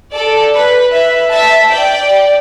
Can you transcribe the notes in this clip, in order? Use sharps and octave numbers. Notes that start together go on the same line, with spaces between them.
A4 D5
B4
B4 E5
E5 A5
D5 G5